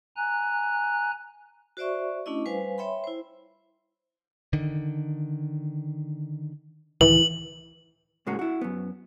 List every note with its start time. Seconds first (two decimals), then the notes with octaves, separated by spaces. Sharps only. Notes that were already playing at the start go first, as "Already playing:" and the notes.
0.16 G#5 A#5 F#6
1.77 F#4 C5 D5 E5 C#6
2.26 A3 C#4 D4 E4 D#5
2.46 G3 B4 C5 F5 G#5
2.78 C#5 E5 G5 B5 C6
3.04 E4 C5
4.53 D3 D#3
7.01 C#2 A2 D#3 E3 F#7
8.27 A2 C#3 G#3 A#3 F#4
8.39 E4 F#4
8.61 F#2 B3